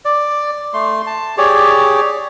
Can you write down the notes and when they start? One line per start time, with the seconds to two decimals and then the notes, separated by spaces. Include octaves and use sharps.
0.05 D5
0.74 A3 C6
1.07 A5
1.37 G4 G#4 C#5 D5